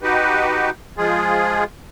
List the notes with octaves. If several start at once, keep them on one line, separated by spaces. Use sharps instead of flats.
D#4 F#4 G4 B4
F3 G#3 F4 G#4